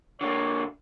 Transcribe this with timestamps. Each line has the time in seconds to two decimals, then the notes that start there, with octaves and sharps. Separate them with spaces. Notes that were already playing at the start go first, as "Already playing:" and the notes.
0.21 D3 A#3 C#5